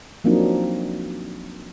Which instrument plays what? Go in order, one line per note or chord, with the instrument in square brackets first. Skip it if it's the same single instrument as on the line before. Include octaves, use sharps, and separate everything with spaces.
[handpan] F3 F#3 A#3 C4 D4 D#4